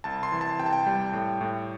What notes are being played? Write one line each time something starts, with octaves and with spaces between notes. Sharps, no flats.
C2 A5
C6
E3
A5
C3 G5
A5
G5
G3
A2
A2